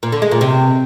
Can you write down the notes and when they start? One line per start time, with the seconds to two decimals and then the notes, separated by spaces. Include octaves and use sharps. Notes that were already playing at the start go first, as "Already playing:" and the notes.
0.03 A#2
0.12 D3
0.22 G#3
0.31 A#2
0.41 C3